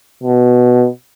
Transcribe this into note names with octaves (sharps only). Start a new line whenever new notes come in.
B2